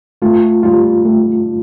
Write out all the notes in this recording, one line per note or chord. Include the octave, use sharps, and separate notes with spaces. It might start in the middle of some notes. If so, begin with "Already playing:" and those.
A3 F4
G3 F4
A3